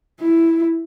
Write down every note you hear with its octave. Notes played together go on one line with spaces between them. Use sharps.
E4